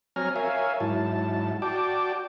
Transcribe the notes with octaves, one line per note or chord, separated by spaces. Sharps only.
F#3 C4 C#5 G#5 A#5 F6
A#4 C#5 E5 F5 G#5
G#2 F#3 E4 A5
F#4 D5 G5 A5 D6